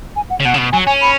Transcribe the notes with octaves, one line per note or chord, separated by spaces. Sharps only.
G#5
F#5
C#3
B2 F#5
C#3
B2
F#3 G#5
C#4 G#5
B5